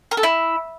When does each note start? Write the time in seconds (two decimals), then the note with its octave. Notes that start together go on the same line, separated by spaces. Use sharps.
0.11 A#4
0.17 A4
0.23 E4